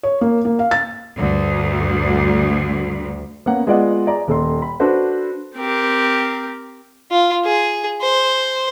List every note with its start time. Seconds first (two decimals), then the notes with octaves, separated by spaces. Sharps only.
0.03 C#5
0.21 A#3
0.45 A#3
0.59 F5
0.71 A6
1.18 D2 G2
3.46 A#3 B3 C#4 F#5
3.67 G#3 B3 F4 D5 D#5 F#5
4.06 G#4 D5 A#5
4.28 D#1 A4 C6
4.62 B5
4.80 D4 F#4 A4 B4 C5
5.55 C4 G4 A#4
7.11 F4
7.45 G#4
8.01 C5